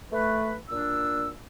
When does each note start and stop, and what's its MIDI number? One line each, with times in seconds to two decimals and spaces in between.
0.12 0.54 57
0.12 0.54 71
0.70 1.30 46
0.70 1.30 62
0.70 1.30 88